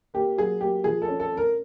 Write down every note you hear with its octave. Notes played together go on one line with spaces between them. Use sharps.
A#3 G4
F#3 G#4
A#3 G4
F3 G#4
A4
C#4
A4
C#4
A#4